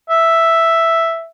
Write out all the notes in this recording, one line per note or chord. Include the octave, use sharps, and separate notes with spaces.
E5